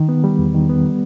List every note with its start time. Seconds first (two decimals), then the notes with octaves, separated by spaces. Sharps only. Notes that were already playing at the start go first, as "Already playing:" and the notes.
Already playing: D#3
0.09 B3
0.24 G3
0.39 E2
0.54 D#3
0.69 B3
0.84 G3